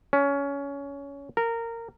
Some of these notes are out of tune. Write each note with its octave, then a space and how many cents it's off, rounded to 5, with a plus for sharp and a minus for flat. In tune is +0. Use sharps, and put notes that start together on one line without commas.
C#4 +20
A#4 -15